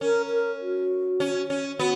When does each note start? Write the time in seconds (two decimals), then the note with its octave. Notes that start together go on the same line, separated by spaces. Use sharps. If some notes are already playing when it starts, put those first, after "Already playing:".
0.01 C#4 A#4
0.30 A#4
0.61 F#4
1.20 C#4
1.50 C#4
1.79 B3 F#4